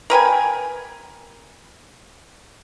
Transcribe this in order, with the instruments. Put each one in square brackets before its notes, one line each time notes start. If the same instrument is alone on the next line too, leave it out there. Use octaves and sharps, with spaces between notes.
[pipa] A#4 B4 G5 G#5